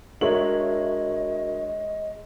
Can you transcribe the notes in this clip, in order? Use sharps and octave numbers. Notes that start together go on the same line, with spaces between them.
G#3 D4 F#4 A#4 C#5 D#5 E5 F#7